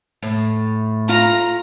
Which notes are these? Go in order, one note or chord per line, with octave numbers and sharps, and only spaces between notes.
A2
F4 A#5